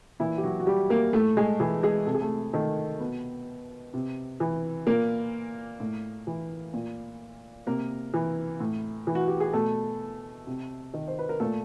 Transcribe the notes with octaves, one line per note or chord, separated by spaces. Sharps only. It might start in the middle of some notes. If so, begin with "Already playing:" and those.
A#2 E3 E4
G4
F#3 F#4
F#4
G3 G4
A#3 A#4
A2 A3 A4
G#3 G#4
E3 G#3 G#4
G#3 G#4
C3 A4
G#4
A3 A4
D#3 A3 A4
B2 B3 B4
C3
E3
A#2 A#3 A#4
A2
E3
A#2
C3 A#3 A#4
E3
A2
E3
F#4
G4
G#4
B2 A3 A4
C3
D#3
C5
B4
A#4
A#2 A3 A4